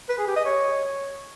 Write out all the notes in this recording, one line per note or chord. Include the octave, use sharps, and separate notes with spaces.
B4
G#4
G4
D#5
C#5